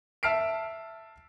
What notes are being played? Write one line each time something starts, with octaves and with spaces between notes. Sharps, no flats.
E5 A5 F6 C7 D7